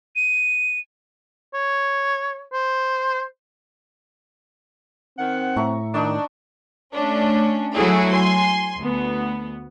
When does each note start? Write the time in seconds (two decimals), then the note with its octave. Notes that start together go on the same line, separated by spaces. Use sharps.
0.16 D#7
1.54 C#5
2.53 C5
5.18 D#3 C4 F#5
5.56 A2 E5 A#5 C#6
5.94 D#3 D4 D#4 D#5 C#6
6.93 A3 C#4 D4
7.74 F#3 A3 E4 F#4 G#4
8.12 G#5 C6
8.80 D2 B3